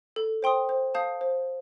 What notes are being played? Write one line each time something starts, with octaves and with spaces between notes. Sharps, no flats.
A4
C5 G5 C6 D#6
C5
F5 A5 D#6 G6
C5